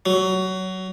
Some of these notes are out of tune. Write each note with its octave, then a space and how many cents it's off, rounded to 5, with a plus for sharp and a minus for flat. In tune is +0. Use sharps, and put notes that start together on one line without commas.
F#3 +20